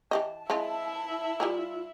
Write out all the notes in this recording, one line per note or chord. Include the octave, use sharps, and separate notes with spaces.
E3 G4 D#5 A5
G#3 C4 E4 F4 E5
G3 F4 G#4 A#4